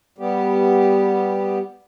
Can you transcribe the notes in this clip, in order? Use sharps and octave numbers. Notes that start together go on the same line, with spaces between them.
G3 B3 G4